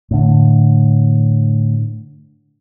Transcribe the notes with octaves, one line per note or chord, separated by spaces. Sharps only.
A2 D3